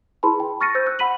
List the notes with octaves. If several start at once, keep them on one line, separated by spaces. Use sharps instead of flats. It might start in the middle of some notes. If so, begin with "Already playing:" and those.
E4 G#4 B4 A5 B5 C6
G5
C#6 F6 A6 A#6 C#7 D#7
C5 E6 G6
E6 F#6
F#5 B5 B6 D#7 F#7